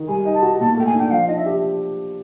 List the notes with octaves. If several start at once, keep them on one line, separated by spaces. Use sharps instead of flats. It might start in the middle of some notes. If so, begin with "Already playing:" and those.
Already playing: D#3
G3 G#5
D#4
A5
F#4
A#2 A5
A3 G5
G#5
D4 G5
F3 F5
D4 D#5
E5
G4